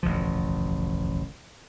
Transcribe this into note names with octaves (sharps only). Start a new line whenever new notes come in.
E1 A1 D2 F3